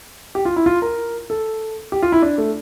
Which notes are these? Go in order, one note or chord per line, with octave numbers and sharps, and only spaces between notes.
G4
F4
E4
F4
A#4
A4
G4
F4
E4
D4
A3